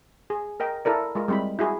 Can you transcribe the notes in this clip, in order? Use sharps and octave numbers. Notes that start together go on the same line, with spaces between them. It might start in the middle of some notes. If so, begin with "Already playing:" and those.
G#4
A#4 D#5 G5
E4 A4 A#4 D5
G#3 F4 A#4
G3 G#3 C4 E4 B5
E4 F#4 G#4